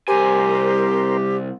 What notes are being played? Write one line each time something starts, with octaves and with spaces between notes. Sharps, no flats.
C2 G4 A#4 C5 G#5